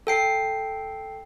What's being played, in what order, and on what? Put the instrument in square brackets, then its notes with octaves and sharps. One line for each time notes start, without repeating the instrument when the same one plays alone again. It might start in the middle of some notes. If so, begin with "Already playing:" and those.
[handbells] A4 G5 C7